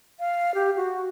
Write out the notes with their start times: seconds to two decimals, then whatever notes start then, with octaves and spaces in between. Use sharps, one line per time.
0.20 F5
0.55 G4
0.77 F#4